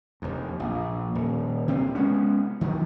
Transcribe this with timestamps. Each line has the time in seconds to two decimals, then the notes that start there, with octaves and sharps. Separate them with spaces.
0.22 F1 D#2
0.60 A#1
1.15 D#1
1.67 D2 C3 B3 C4
1.95 G#3 B3 C#4
2.61 D#3 F3 F#3